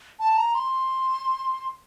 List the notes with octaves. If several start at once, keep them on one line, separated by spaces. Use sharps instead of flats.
A5
A#5
C6